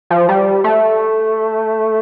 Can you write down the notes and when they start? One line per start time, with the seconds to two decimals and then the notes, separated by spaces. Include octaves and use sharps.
0.10 F3
0.29 G3
0.64 A3